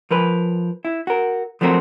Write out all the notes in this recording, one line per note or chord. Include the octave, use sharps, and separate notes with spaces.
F3 A#4 B4
E4
F#4 A#4
F3 F#3 A3 C4 F#4 A#4